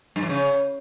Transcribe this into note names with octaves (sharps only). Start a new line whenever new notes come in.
G2
E3
C#3